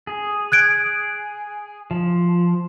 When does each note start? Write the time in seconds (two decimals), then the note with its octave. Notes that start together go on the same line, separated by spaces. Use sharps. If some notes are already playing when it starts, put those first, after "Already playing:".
0.07 G#4
0.52 F#6 G#6 D7
1.91 F3